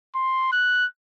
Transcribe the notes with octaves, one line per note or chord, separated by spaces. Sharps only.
C6
F#6